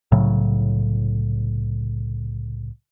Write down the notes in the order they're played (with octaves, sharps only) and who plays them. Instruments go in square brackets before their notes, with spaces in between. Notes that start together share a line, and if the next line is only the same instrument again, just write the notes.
[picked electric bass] C2 A2 C#3 F#3